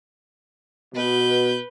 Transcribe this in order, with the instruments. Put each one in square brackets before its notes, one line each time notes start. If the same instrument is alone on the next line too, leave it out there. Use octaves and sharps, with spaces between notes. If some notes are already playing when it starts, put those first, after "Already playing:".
[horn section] B2 [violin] B4 G6